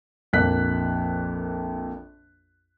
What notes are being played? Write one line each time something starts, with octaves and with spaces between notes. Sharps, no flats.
A#1 F2 A#3 F#6 B6